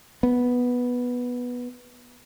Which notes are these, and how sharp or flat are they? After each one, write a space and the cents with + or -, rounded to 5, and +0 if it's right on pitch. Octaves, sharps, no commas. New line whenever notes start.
B3 -5